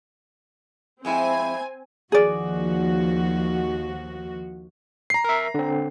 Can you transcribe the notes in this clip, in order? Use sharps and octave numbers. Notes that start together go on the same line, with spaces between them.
F2 G#3 C4 E4 C5 G#5
D#2 F3 F#4 G#4 D5
A#5 C7
A#4 E5
D3 C4